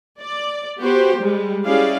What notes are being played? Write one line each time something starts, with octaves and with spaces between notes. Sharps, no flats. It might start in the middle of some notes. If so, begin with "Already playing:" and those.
D5
B3 F#4 G4 C5
G3 G#3
G3 C#4 E4 G#4 D5 F5